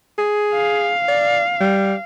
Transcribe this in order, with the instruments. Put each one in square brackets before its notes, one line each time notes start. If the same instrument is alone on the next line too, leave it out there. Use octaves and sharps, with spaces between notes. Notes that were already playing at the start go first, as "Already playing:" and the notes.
[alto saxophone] G#4
[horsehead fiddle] F5
[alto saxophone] D5
G3